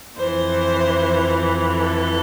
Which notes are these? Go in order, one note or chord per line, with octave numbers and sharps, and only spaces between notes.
F2 E3 C5
A4